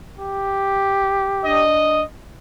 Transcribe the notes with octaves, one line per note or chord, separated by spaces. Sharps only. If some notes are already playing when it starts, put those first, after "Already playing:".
G4
D4 D#5